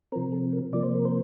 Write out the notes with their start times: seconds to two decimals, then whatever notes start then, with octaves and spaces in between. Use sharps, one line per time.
0.12 C4 A#4
0.15 C3 F3
0.32 A4
0.53 A#4
0.73 C3 F3 A#3 D5
0.83 C5
0.95 A#4
1.05 C5